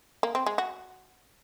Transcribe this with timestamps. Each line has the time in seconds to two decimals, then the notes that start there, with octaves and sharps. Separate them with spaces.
0.23 A#3
0.35 C4
0.46 G#3
0.58 F#4